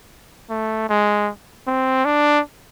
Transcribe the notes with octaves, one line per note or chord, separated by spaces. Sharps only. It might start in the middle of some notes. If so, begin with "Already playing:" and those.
A3
G#3
C4
D4